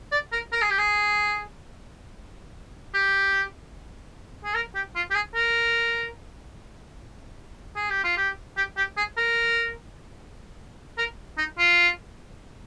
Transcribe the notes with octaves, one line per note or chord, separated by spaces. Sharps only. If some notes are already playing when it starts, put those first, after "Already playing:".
D5
A#4
A#4
G#4
G4
G#4
G4
G#4
A#4
G4
F4
G4
G#4
A#4
G#4
G4
F4
G4
G4
G4
G#4
A#4
A#4
D#4
F4